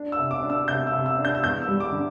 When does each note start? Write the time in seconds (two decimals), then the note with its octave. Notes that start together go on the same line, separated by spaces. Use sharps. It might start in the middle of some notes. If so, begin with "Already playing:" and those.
Already playing: D4
0.12 E6
0.18 C3
0.31 D6
0.43 D4
0.50 E6
0.68 C3 G6
0.87 E6
0.93 C3
1.06 E6
1.18 D4
1.25 G6
1.35 E6
1.44 E2 G6
1.62 E6
1.68 G3
1.80 D6
1.92 D3